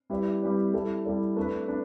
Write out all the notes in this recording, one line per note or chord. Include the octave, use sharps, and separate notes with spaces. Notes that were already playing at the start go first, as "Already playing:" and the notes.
G3 E4 G4 B4 D5
G3 E4 G4 B4 D5
G3 E4 A4 D5
G3 E4 A4 D5
A3 D4 B4
D4 B4